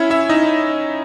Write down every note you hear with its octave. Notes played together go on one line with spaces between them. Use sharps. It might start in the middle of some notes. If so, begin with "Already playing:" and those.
Already playing: C#4 E4 C#5 E5
E4 E5
D#4 D#5